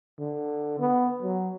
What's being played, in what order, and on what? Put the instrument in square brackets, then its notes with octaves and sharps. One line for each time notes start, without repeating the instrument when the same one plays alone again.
[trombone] D3
B3
F#3